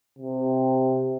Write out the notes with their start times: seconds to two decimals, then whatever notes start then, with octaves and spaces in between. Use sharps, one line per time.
0.19 C3